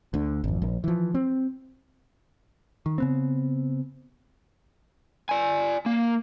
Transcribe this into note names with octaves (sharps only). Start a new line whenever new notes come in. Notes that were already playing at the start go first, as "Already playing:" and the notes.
D2 D3
G#1 F2
A#1
E3 F3
C4
D#3
C#3 B3 C4
D5 G#5
A#3